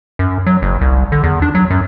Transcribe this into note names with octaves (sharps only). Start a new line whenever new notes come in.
F#2
F#3
F#1
C2
D3
E2
D4
F#3
F#2